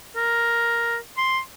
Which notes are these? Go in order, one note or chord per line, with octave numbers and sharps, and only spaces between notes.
A#4
C6